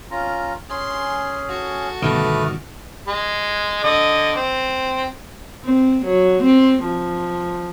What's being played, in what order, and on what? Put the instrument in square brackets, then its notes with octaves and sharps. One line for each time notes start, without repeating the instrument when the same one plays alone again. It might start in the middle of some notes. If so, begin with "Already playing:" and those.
[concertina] C#4 F4 A#5
[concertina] C#4 G#4 [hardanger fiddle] C6
[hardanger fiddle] F#4 A4
[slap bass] G1 B2 D#3 [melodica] A3 B4 [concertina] D5 D#6 F6
[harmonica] G#3
D3 D#5
C4
[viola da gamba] C4
F#3
C4
F3